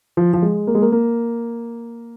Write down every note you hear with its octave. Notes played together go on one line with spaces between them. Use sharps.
F3
F3
G#3
A#3
G#3
A#3
A#3